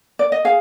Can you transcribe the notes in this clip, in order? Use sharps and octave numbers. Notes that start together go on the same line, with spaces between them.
D5
D#5
G#4 F5